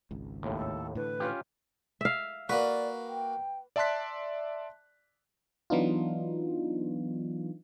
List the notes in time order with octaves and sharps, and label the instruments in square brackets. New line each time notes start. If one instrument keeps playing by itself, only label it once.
[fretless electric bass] G#1 C#2
[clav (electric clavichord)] D#2 A2
[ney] A4
[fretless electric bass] A2 D3 E3 [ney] B4
[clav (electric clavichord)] C#4 F4 G4
[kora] E5 F5
[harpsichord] A#3 F#4 [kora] B4 [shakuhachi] D5
[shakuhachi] G5
[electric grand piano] D5 E5 A5 C6 F#6 B6
[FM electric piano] E3 F#3 B3 D4 D#4 F4